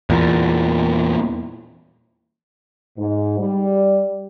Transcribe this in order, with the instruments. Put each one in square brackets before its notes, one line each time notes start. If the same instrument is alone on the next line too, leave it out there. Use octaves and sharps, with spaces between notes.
[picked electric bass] E2 A#2
[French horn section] G#2
G3